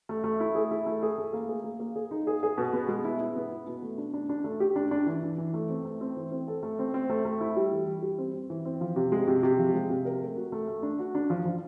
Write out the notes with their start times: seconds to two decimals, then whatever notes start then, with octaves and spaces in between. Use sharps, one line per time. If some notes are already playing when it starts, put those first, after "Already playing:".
0.09 A3
0.24 A3
0.40 E4
0.55 G#4
0.71 E4
0.86 A3
1.03 G#4
1.18 A3
1.33 A#3
1.49 G#4
1.64 A#3
1.80 A#3
1.96 G#4
2.11 D#4
2.27 G#4
2.43 G#4
2.58 B2
2.73 B3
2.88 G#3
3.05 E4
3.20 E4
3.36 B3
3.52 E4
3.67 B2
3.83 A3
3.98 D4
4.14 D4
4.29 D4
4.44 A3
4.60 G4
4.76 D4
4.91 D4
5.06 E3
5.23 E3
5.38 E3
5.54 A3
5.69 C4
5.85 A3
6.01 C4
6.16 E3
6.32 C4
6.48 A4
6.63 A3
6.79 C4
6.94 C4
7.10 A3
7.25 A3
7.41 E4
7.56 G3
7.72 E3
7.87 E3
8.02 G3
8.18 C4
8.34 C4
8.50 E3
8.65 C4
8.81 F3
8.96 C3
9.12 G#3
9.27 C3
9.43 C3
9.59 F3
9.74 G#3
9.90 C3
10.05 A#4
10.22 A3
10.36 F#4
10.52 A3
10.68 A3
10.83 D4
10.99 F#4
11.15 D4
11.30 F3
11.45 F3